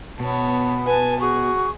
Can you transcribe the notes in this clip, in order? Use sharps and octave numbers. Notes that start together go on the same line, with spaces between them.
B2 B3 C#5 A5
B4 G#5 A5
F#4 G#4 C#6